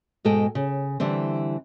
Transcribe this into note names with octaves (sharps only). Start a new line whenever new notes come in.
G#2 B2 G#3 A4 D#5 G5
C#3
D3 E3 G3 C4